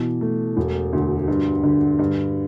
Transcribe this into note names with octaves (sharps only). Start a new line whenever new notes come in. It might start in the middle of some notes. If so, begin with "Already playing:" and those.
Already playing: B2 E3
A3
E1
D2
G2
D3
G2